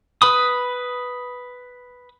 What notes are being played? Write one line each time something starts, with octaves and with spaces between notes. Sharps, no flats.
B4 B5 D#6